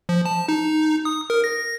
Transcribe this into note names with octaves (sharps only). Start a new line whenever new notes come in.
F3
A5
D#4
D#6
A#4
A#6